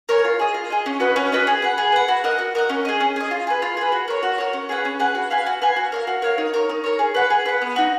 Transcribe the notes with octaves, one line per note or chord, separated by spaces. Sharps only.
A#4 C#5 G#5
F4
G#4 D#5
F4
G#4 D#5
C#4
F#4 B4 D#5
C#4
F#4 B4 D#5
G#4
B4 F#5
G#4
B4 F#5
F#4
A#4 D#5 F#5
F#4
A#4 D#5 F#5
C#4
G#4 D#5
C#4
G#4 D#5
F4
G#4 B4
F4
G#4 B4
F#4
A#4 C#5
F#4
A#4 C#5
C#4
G#4 B4 F#5
C#4
G#4 B4 F#5
F#4
B4 F5 G#5
F#4
B4 F5 G#5
F#4
A#4 C#5 F5
F#4
A#4 C#5 F5
D#4
A#4 C#5
D#4
A#4 C#5
G#4
B4 F#5
G#4
B4 F#5
B3
D#4 F#4